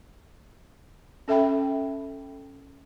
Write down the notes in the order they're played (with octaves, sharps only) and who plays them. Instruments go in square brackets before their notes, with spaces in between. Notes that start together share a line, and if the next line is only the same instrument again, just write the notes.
[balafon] C#4 A4 E5 G5 B5